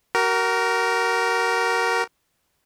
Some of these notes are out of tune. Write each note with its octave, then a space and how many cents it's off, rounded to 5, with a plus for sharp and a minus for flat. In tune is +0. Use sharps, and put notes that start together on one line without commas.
F#4 +35 A#4 +0